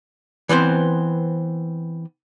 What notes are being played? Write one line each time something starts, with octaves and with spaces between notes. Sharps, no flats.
E3 B3 C4 C5